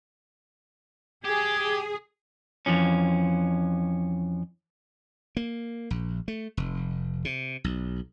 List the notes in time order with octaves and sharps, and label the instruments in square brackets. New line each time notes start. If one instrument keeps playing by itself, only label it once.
[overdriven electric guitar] G4 [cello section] G#4 [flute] G#6
[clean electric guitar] F2 E3 F3 C#4
[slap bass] A#3
A#1
A3
F1
C3
B1